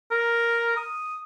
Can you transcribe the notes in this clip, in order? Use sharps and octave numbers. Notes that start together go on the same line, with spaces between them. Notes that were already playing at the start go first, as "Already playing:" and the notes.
A#4
D#6